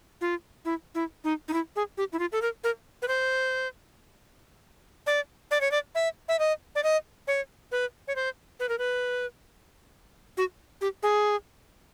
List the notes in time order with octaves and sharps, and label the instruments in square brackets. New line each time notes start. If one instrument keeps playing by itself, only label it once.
[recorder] F4
E4
E4
D#4
D#4
E4
G#4
G4
E4
F4
A4
A#4
A#4
B4
C5
D5
D5
C#5
D5
E5
E5
D#5
D5
D#5
C#5
B4
C#5
C5
B4
A#4
B4
F#4
G4
G#4